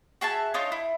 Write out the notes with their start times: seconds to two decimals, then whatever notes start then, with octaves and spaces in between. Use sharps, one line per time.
0.21 F#4 G#4 E5 A5
0.54 D4 D#4 F4 C#5
0.72 E4